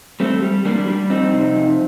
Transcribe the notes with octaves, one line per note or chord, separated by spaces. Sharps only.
G3 A3 C4
G3
G3 A#3 D4
G3
F2 C4 D#4
C3
F2